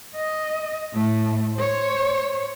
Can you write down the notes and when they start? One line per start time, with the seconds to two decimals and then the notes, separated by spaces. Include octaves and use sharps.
0.15 D#5
0.93 A2 A3
1.55 C5 C#5